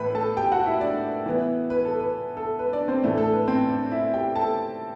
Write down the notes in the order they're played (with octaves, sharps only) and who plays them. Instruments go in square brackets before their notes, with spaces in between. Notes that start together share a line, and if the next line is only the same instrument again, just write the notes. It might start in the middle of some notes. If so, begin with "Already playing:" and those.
Already playing: [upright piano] A2 E3 A3 E4 B4 B5
A4 A5
G4 G5
F#4 F#5
E4 E5
D4 D5
E3 B3 E4
B4
A4
B4
A4
B4
D4 D5
C4 C5
A2 E3 A3 D4
A4
B4
C4 C5
D4 D5
E4 E5
G4 G5
A4 A5